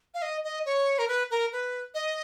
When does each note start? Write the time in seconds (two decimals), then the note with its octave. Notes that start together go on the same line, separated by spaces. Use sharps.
0.14 F5
0.22 D#5
0.44 D#5
0.66 C#5
0.98 A#4
1.08 B4
1.31 A#4
1.52 B4
1.94 D#5